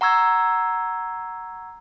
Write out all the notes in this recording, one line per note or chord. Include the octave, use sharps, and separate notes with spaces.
F#5 A#5 C#6 E6 G#6